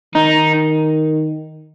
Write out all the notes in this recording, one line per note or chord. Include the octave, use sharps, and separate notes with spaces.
D#3 D#4